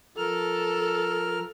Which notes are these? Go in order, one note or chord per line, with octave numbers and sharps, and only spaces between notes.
F3 A4 A#4 F6